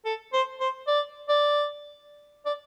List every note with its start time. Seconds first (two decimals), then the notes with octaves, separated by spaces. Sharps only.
0.05 A4
0.33 C5
0.60 C5
0.87 D5
1.29 D5
2.46 D5